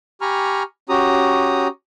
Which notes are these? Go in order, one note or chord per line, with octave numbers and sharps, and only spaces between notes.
G4 G#5 A#5 B5 C#6 F6
C#4 F#4 G4 A#5 D#6